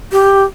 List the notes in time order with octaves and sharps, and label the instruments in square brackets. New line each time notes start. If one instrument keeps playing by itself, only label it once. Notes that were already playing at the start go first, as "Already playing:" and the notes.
[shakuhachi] G4